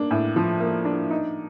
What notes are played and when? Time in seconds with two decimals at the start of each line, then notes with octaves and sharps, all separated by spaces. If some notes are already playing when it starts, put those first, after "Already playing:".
Already playing: A#3 D4
0.11 A2
0.36 F3
0.60 A#3
0.85 D4
1.10 D#4